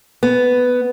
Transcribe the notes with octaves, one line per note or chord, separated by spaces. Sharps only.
B3